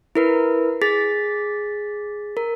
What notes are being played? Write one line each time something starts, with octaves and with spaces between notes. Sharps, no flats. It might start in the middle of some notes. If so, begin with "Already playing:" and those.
E4 A#4 B4
G#4 A6 B6
A#4